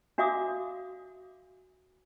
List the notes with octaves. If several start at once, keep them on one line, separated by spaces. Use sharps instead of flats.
D4 F#4 E5 F5 D6 D#6